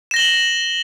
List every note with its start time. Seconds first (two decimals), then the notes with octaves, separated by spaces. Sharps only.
0.11 E7
0.14 A#6
0.16 G7
0.19 F#7